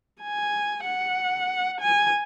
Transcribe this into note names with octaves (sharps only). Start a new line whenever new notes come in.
G#5
F#5
G#5